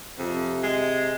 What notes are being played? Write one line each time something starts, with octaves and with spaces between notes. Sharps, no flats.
F2 C3
G#3